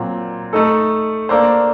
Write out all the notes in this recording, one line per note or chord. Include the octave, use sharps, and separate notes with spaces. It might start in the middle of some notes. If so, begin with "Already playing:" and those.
Already playing: A#2 F#3 C4
A3 D#4 A4
A#3 D4 A4 C5